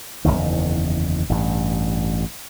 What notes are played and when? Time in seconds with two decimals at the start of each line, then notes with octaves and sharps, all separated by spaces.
0.25 F#1 B1 E2 D#3
1.30 A1 G2